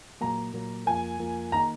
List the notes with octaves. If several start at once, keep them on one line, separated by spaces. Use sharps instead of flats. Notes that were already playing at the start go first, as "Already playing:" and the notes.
A#2 F#3 A#3 A#5
A#2 F#3 A#3
F2 F3 A#3 F4 A#4 G#5
F2 F3 A#3 F4 A#4
D#3 A#3 D#4 A#5